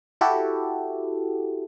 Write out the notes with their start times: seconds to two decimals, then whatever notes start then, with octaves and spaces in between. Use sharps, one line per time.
0.21 E4 F#4 G4 A4